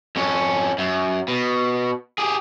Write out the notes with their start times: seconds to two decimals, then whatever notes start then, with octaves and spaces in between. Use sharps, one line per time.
0.16 F2 C#4
0.78 F#2
1.28 B2
2.18 G4 G#4